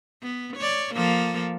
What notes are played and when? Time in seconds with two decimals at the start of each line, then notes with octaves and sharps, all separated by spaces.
0.23 B3
0.57 C#5 D5
0.95 F3 A#3 A4